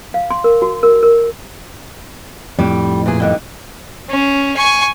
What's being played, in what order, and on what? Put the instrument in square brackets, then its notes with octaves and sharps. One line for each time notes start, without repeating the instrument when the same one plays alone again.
[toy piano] F5
C6
A#4
F#4
A#4
A#4
[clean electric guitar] F2 A2 [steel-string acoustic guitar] G3
[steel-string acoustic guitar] A#2 E3 G#4
G2 D3 D#3
[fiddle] C#4
G#5 C#6